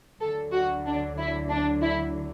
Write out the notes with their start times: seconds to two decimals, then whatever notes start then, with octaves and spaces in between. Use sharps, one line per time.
0.20 D2 D3 F#3 A4
0.53 F#4
0.86 D4
1.18 E4
1.49 D4
1.82 E4